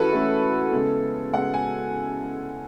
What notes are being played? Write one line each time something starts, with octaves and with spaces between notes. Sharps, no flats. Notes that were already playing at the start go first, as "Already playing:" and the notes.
Already playing: E3 C#4 E4 F#4 A4 B4
E3 A3 C#4
C#3 G#3 B3
C#3 G#3 B3 F#5
G#5